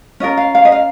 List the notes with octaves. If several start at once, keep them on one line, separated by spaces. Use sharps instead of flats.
C#4 F4 A#4 D#5
F5
F5
D#5
F5